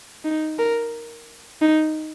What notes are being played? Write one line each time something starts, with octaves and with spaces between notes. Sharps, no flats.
D#4
A#4
D#4